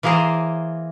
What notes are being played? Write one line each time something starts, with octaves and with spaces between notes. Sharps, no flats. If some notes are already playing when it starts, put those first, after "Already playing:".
E3 A#3 G#4 A#4 C5